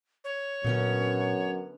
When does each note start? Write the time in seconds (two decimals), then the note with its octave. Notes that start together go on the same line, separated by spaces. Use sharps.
0.24 C#5
0.64 F#2 A#2 D3 B3 C#4